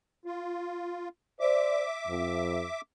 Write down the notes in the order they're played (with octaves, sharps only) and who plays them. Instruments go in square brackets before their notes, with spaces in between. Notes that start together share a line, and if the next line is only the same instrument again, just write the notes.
[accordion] F4
[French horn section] C5 D5 [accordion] E5 D6
[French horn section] F2